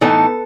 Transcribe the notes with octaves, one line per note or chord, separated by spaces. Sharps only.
A2 E3 B3 D#4 A4